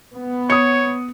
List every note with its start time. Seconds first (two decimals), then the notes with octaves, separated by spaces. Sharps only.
0.14 B3
0.50 C#5 D#6 C#7